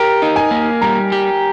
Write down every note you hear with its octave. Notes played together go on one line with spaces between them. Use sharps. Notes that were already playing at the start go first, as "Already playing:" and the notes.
Already playing: G4 A#4
D#4
G#5
A#3
G3 A#5
G4